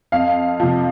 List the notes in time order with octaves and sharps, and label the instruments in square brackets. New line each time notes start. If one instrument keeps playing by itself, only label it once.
[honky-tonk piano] F2 F5
C3 F3